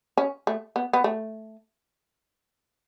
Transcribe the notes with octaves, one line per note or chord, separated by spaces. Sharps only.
C#4
A3
B3
B3
A3